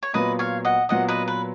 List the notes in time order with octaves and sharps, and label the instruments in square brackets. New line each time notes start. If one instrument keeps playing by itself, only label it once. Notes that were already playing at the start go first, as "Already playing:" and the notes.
[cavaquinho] C#5
[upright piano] A#2 F#3 B3 F4 [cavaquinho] B4 D#5
[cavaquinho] C#5 F5
D#5 F#5
[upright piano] A#2 F#3 B3 F4 [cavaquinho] D#5 F#5
[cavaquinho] B4 D#5
B4